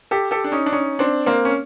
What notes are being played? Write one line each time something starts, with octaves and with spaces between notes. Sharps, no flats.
G4 A4
G4 A4
D4
C#4 D#4
D4
C#4 D#4
C4 D4
A#3 C4
C#4